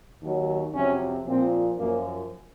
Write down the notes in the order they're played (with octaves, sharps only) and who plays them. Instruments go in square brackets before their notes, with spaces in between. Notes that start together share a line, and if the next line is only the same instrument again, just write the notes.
[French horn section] D#2 D#3 F#3
F2 C3 F#3 C#4
A#2 F3 C4
F#2 F3 A#3